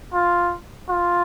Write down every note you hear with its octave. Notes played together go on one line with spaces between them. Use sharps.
F4
F4